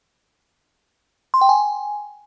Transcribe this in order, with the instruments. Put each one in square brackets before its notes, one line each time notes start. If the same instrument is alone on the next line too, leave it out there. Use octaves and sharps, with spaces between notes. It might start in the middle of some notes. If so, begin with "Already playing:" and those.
[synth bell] C6
G5
G#5